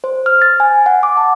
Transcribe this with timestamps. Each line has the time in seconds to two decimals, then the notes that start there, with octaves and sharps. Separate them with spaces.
0.04 C5
0.26 F6
0.42 A6
0.60 G#5
0.86 F#5
1.03 D6
1.17 A5